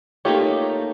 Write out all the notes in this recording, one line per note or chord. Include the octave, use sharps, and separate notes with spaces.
A3 A#3 D#4 F4 G4 C#5